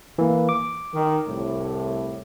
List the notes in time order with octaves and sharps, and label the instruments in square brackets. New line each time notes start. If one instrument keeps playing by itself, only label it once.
[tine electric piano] E3 A#3
D6
[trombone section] D#3
C2 A2